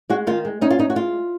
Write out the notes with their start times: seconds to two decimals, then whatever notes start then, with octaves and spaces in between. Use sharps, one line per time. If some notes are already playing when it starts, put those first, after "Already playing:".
0.10 G#3 F#4
0.27 D#3 F4
0.45 G#3
0.61 C#4 D#4
0.70 F4
0.79 C#4 D#4
0.90 F#4
0.95 G#3 F4